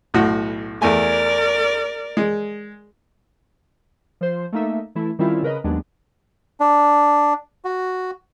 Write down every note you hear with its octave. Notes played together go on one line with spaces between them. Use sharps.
B1 A2 F#4
E2 A3 A#4 D5 G#5
G#3
F3 C5
A3 A#3 D#4 E5
E3 A3 E4
D#3 G3 C4 C#4 E4 F4
C#3 A#4 B4 D#5
D#2 F#3 G#3 B3 D4
D4
F#4